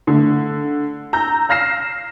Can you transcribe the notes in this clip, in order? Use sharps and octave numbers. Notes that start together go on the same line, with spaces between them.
D3 A3
A#5 E6 G6
F5 F6 A#6 C7 E7